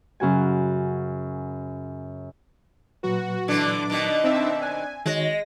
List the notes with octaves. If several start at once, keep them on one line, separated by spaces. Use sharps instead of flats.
F#2 C#3 F#4 G#5
A#2 F#3 F#4 B4
D3 E3 D4 D6
B2 D#3
C4 D4 D#4 E5
D5 G#5 F#6
D#3 G#3 F#4 C#5 A#6